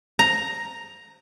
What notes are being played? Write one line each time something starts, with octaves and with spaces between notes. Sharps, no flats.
A#5